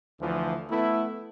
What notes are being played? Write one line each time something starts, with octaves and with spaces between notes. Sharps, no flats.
D2 E3 F3
A3 B3 E4